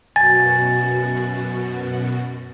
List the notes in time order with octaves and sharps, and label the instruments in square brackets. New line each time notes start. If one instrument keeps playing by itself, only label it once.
[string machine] F#2 B2 F#3 [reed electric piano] G#5 [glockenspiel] A6